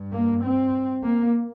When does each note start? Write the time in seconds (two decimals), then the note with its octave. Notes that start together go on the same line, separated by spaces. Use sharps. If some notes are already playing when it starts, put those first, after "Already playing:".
Already playing: G2
0.12 A#3
0.43 C4
1.03 A#3